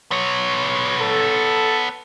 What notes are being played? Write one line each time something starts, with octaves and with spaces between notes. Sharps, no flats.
B3 C#5
A4